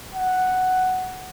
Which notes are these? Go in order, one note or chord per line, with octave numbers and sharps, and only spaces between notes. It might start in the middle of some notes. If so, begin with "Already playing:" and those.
F#5